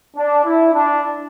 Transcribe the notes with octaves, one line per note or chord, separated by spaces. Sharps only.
D4
E4
D4